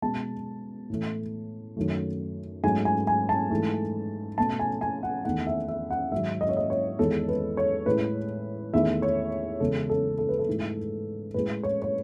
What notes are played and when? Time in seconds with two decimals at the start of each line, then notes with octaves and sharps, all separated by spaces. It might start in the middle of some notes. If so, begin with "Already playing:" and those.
0.02 B2 G#3 A5
0.90 A2 E3 A3
1.77 F#2 D#3 F#3 A3
2.64 G#2 F#3 A3 G#5
2.85 G#5
3.07 G#5
3.29 A5
3.50 G#2 E3 A3
4.38 B2 A3 A5
4.59 G#5
4.81 G#5
5.03 F#5
5.25 E2 D#3 A3 F#5
5.47 E5
5.68 E5
5.90 F#5
6.12 G#2 D#3 F#3 E5
6.41 D#5
6.49 C#5
6.57 D#5
6.70 C#5
6.99 E2 D#3 G#3 A4
7.28 B4
7.57 C#5
7.86 A2 G#3 B4
8.73 E2 D#3 A3 E5
9.02 C#5
9.60 E2 C#3 G#3 A4
9.90 A4
10.18 A4
10.29 B4
10.39 A4
10.48 G#2 E3 A3
11.34 A2 G#3 B4
11.63 C#5
11.82 C#5